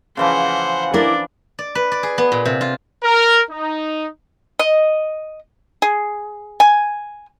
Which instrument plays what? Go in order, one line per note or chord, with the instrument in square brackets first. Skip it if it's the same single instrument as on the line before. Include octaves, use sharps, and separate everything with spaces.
[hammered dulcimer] C#3 E3 F3 [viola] C5 F#5
[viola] D4 [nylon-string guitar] E4 A#4 [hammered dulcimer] D5 D6
[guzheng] D5
B4
D5
G#4
B3
A#2
C3
F4
[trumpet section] A#4
D#4
[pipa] D#5
G#4
G#5